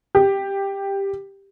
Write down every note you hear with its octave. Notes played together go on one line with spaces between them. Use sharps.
G4